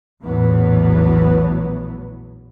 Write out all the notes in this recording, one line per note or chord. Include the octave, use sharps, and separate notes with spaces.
A#1 E2 A2 E3 F#3 B3